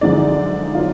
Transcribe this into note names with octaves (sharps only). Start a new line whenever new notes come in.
F#2 D3 F3 G#3 D#4 D5
F#3 B3 F4